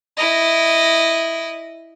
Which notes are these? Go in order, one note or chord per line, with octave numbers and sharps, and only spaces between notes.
E4 D#5